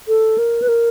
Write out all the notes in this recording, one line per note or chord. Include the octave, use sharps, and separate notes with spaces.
A4
A#4
B4
A#4